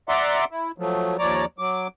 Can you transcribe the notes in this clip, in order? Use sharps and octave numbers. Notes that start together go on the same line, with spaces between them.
D5 E5 F#5 A#5 C6 D6
E4
F3 F#3 A3
D#2 F3 C#5 D5 A#5 D6
F#3 D6